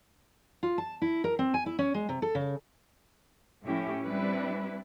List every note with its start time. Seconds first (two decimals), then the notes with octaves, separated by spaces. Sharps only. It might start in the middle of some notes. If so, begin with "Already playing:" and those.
0.63 F4
0.78 A5
1.02 E4
1.24 A#4
1.39 C4
1.54 G#5
1.66 E4
1.79 C#4
1.94 G#3
2.09 C3
2.22 A4
2.35 C#3
3.65 A2 F3 C#4 E4 G4
4.06 G3 C4 D4 E4 B4